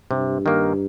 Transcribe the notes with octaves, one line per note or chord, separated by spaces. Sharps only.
G2 C3
D#3 A#3